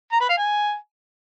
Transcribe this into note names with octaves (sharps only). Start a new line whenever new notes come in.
A#5
B4
F5
G#5